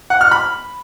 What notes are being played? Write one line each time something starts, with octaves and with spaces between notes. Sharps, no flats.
F#5
F6
B5